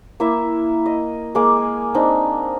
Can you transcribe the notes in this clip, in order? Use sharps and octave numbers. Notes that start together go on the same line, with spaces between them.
A#3 E4 E5
D#5
G#3 A#3 D6
G#5
C4 D4 D#4